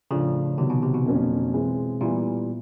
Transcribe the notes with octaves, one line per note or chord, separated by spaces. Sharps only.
A2 C#3 F3 A3 D4 F4
C3 D#3 F#3 B3
B2
C3
B2
F2 D3 F#3 A#3 C#4
E3 G#3 C4
A#2 E3 G3 B3 E4